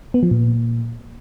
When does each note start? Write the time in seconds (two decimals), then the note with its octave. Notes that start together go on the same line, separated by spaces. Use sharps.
0.14 B3
0.23 F3
0.31 A#2